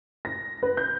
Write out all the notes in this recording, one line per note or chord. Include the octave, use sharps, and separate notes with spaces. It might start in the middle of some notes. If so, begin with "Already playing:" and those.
A#6
B4
G6